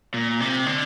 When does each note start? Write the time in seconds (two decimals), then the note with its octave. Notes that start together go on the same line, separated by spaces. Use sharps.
0.14 A#2
0.40 C3
0.66 D3